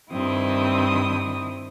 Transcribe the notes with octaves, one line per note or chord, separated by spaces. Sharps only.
G2 D#3 C4 E4 D#6